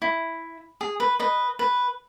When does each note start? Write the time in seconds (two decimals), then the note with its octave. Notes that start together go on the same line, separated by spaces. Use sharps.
0.02 E4
0.81 G#4
1.00 B4
1.19 B4 D#5
1.59 B4